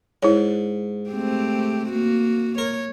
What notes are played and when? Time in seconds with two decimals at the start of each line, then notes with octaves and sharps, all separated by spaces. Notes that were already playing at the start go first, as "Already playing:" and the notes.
0.23 G#2 E4 C#5
1.10 A3 C4 G4
1.89 A#3 F#4
2.58 A#4 C#5